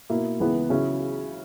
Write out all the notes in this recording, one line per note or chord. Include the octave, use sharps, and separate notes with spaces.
B2 A#3 E4
C#2 C#3 E3 B3 E4
C#3 F#3 C#4 E4